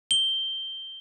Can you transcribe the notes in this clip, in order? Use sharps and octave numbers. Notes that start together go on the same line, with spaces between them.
G7